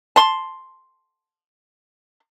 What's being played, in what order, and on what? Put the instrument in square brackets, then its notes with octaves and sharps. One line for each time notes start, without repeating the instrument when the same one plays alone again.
[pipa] A5 C6